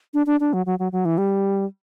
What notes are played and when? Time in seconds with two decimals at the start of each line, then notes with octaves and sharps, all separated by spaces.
0.14 D4
0.26 D4
0.40 D4
0.53 F#3
0.66 F#3
0.79 F#3
0.92 F#3
1.05 E3
1.18 G3